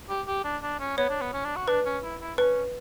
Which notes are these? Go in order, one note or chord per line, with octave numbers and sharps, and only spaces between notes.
G4
G4
D4
D4
C#4
B3 C#5
D4
B3
C#4
D4
F#4
D4 B4
C#4
E4
E4
C#4 B4